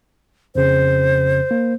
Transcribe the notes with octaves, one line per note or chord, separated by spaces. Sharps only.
F2 C#3 C5
A#3